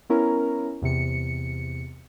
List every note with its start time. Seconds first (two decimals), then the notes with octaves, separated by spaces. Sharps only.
0.10 B3 C#4 E4 A#4 A#5
0.82 E2 C3 C#7